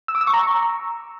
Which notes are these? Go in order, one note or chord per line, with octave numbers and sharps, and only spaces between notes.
E6
D6
E6
C#6
A#5